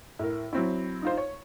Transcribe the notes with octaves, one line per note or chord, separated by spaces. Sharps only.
A2 A#4
F#3 C4 E4
D#4 F4 C5
C#5